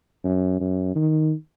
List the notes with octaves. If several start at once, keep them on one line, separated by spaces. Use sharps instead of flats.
F#2
F#2
D#3